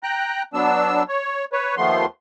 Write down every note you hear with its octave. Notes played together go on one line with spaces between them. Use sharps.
G5 A#5 F#6
F#3 B3 D4 E6
C#5
B4 C#5
D#2 F3 A3 B3 C6